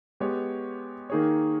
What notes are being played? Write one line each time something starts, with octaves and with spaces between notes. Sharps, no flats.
G#3 B3 G4 C#5
D#3 A#3 D#4 G#4 C#5